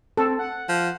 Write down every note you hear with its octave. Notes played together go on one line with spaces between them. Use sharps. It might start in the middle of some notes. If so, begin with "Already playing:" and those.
C4 A4
F#5
F3